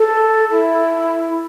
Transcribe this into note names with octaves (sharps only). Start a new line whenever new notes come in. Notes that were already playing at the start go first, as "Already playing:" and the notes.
Already playing: A4
E4